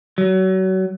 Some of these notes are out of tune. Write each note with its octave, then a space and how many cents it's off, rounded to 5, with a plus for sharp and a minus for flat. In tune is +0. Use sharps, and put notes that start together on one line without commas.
F#3 +30